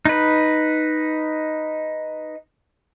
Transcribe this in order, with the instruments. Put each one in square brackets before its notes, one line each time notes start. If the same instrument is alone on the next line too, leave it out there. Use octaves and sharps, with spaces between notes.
[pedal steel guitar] D#4 B4